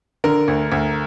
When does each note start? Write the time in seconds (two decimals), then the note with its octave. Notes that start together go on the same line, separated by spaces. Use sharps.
0.24 D3 A#4
0.48 D2
0.72 D2